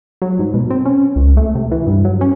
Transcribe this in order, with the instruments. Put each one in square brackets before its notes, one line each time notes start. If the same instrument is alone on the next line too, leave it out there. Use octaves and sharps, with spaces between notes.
[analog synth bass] F#3
G#2
B2
C4
C#4
C#2
A3
C3
E3
G2
F#3
C#4